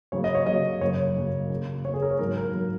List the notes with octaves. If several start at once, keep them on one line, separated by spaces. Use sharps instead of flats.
C#3 F#3 A#3 C#5
D#5
C#5
C#3 F#3 A#3 D#5
F#2 C#3 A#3 C#5
F#2 C#3 A#3
C#3 A#3
C#3 A#3 C#5
G#4
A#4
C#5
G#2 F#3 A#3 A#4
A#4
F#3 A#3 A#4